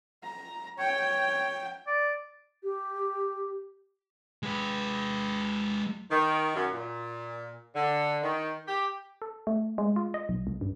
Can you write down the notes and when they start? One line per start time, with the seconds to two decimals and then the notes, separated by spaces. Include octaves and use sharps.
0.23 A#5
0.78 C#5 G5
1.87 D5
2.63 G4
4.43 G#3 B4
6.10 D#3
6.54 F#2
6.72 A#2
7.74 D3
8.22 D#3
8.67 G4
9.22 A4
9.47 A3
9.78 G#3
9.96 F4
10.14 D#5
10.29 B1
10.47 C2
10.61 G2